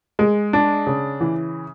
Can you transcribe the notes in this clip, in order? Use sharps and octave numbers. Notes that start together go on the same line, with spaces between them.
G#3
D4
C#3
E3